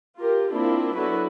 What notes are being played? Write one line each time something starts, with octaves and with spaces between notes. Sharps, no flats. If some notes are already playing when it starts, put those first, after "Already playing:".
F4 G4 A#4
A#3 C4 D4 E4 F4
D3 F#3 B3 E4 F#4 B4